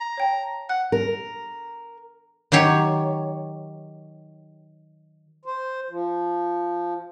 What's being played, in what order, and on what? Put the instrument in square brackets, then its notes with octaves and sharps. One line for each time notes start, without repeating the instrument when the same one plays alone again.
[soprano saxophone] A#5
[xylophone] C#5 G5 A5
[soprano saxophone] F#5 [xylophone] F#6
[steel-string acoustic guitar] A#4
[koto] D#3 F#3 G4 C#5
[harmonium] C5
F3